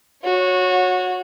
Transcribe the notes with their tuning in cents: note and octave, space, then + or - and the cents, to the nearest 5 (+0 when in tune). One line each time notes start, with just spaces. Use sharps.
F#4 -20 C#5 -5